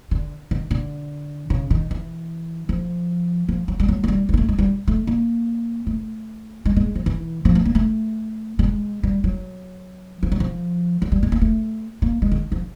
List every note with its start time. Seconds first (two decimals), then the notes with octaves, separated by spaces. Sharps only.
0.11 D3
0.51 D#3
0.71 D3
1.50 C#3
1.70 D#3
1.91 E3
2.69 F3
3.49 F3
3.68 F#3
3.80 G3
3.88 F#3
4.04 G#3
4.08 G3
4.29 G3
4.34 A#3
4.37 A3
4.49 G#3
4.58 G3
4.88 A3
5.07 A#3
5.87 A3
6.65 G#3
6.76 G#3
6.95 F3
7.06 E3
7.45 F3
7.55 A3
7.65 A#3
7.75 A3
8.59 G3
8.64 G#3
9.03 G3
9.24 F#3
10.23 F3
10.32 F#3
10.40 F3
11.02 F#3
11.12 G3
11.23 G#3
11.32 A#3
11.41 A3
12.02 A#3
12.22 G#3
12.32 D#3
12.52 F3